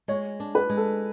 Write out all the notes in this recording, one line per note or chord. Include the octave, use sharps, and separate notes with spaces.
G#3 C#5
D4
B4
G#3
A4